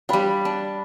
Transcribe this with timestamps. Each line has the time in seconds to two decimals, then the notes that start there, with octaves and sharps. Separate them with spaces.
0.09 G3 D4 F5 G5 B5
0.45 D4